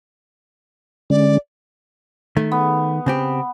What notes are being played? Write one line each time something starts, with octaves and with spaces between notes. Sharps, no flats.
D3 G#3 C#4 D5
D#3 A3
B3
C#3 C4 G4